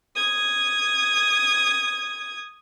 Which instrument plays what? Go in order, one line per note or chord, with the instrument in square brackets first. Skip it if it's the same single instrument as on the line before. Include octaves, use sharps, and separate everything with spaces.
[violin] D#6 G#6